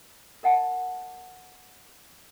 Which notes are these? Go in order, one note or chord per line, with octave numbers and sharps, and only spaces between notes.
A#4 D#5 F#5 A5